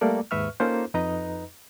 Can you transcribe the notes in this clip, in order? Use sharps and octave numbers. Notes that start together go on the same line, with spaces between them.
G3 A3 A#3 A4 D5
D#2 G#2 B4 E5 C#6 F6
A#3 C#4 D#4 F4 A4 C5
F2 D#4 B4 D#5 A#5